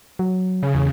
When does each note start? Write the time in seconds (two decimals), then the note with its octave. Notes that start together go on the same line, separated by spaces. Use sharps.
0.19 F#3
0.63 C#3
0.75 E2